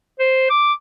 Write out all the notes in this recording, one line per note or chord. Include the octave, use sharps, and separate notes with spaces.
C5
D6